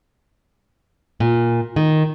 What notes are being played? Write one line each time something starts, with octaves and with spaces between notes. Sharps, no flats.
A#2
D#3